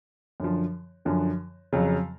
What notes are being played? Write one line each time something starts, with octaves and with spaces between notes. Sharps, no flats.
F#2 D3 F3
F#2 D3 F3
F2 C#3 F#3